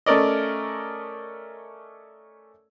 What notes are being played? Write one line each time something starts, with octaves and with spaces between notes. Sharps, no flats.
A3 C#4 A#4 D5 D#5